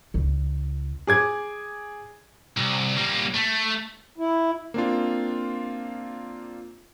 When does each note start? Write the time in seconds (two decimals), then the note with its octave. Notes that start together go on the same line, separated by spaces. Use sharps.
0.14 C#2
1.07 G#4 D6 G#6
2.57 C2
2.97 G3 A#3
3.36 A3
4.18 E4
4.74 A#3 C4 D4 F4